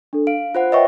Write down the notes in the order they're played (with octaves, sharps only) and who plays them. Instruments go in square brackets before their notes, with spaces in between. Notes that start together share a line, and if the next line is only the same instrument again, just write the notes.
[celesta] D4 A4
[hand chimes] F5 [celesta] D7
[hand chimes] F4 C5 F#5
[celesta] B4 C#5 G5 [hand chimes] D#5 E5 C#6